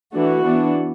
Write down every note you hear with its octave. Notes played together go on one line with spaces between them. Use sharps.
E3 A3 D4 F#4
E3 B3 D4